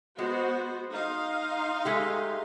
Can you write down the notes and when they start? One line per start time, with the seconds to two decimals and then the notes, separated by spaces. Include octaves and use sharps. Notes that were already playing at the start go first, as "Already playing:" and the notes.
0.18 G#3 B3 F#4 C5
0.92 D#4 F5 C6
1.85 G#3 A3 G4